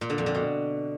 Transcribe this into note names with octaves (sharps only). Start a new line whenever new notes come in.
A#2
D3
F2
D3
B2